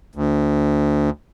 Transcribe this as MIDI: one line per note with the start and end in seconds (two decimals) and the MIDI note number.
0.15 1.10 38